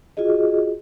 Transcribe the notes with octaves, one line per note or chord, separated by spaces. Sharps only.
F4 F#4 G#4 D#5